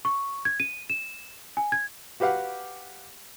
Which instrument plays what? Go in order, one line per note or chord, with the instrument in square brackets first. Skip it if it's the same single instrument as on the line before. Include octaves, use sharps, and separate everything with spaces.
[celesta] C#6
G#6
D#7
E7
G#5
G#6
[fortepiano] F#4 G4 B4 F5 F#5